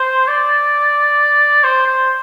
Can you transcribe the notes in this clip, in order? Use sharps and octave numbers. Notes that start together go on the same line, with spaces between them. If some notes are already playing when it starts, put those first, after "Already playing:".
Already playing: C5
D5
C5
C5